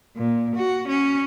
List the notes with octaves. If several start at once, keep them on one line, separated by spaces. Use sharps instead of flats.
A#2
F#4
C#4